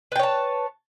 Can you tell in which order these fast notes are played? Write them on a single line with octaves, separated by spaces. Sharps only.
B4 G5 C#5 A5